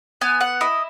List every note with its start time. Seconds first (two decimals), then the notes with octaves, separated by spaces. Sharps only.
0.21 B3 G#5
0.41 F#5
0.61 E4 D#5